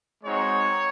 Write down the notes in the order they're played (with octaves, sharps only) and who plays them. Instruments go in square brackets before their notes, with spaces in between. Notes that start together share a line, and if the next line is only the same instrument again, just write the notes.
[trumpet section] G#3 C4 D#4 F#4 C#5